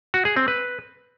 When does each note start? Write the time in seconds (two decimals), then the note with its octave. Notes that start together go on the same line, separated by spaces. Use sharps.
0.14 F#4
0.25 G#4
0.36 C4
0.48 B4